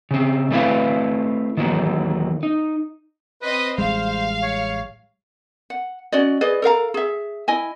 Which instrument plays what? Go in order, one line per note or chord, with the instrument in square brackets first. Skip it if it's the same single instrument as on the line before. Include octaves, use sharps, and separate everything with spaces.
[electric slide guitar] C#3 C4
A3 C4 D4 E4 B4 F5
D#3 E3 F#3 A#3
D#4
[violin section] C4 C5 D#5 [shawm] B4
[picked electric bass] A1 G3 G#3 [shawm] C5 [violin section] F5
[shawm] C#5
[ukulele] F#5
C#4 F#4 D5 D#5
G#4 B4 D5 D#5
A4 A#4 F5 A#5
G#4 E5
E4 D#5 G#5